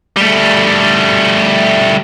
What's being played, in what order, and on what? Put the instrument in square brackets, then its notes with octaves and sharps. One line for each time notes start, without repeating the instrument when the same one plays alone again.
[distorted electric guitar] G3 A3